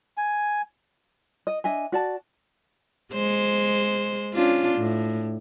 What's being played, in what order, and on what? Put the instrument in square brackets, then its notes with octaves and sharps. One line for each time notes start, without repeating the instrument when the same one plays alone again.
[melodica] G#5
[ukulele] D#5
D4 D#5 E5 G#5
F#4 D5 A5
[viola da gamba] G#3 C5
C#4 D4 F4
A2